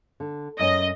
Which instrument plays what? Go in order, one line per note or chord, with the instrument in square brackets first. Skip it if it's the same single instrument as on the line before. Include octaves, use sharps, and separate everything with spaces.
[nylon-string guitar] D3
[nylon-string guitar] F#2 C#4 [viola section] D#5